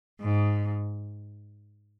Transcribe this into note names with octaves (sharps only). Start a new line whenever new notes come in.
G#2